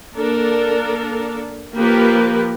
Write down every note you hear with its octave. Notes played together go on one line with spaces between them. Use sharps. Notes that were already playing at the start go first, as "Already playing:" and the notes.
A#3 D4 A4 A#4
F3 A#3 G4 A#4 B4